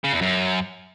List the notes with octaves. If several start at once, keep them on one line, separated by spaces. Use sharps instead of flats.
C#3
E2
F#2